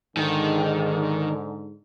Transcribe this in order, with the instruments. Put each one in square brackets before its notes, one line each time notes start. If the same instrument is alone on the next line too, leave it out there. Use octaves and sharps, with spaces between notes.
[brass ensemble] G#2 D3 [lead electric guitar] D#3